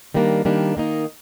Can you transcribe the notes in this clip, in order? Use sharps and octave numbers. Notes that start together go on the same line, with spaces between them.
D#3 G3 A#3 D4
D#3 G3 A#3 D4
D#3 A#3 D#4